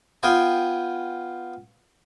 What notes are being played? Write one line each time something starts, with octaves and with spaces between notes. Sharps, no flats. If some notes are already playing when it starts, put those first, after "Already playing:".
B3 F4 F5 G5 G#5